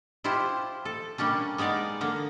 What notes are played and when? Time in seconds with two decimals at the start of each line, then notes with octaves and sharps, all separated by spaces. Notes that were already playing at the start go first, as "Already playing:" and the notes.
0.24 E4 F4 G4 C5
0.85 A4
1.18 G3 A#3 C#4 D4
1.58 G#3 B3 D#4 D5 F5
2.01 D3 A#3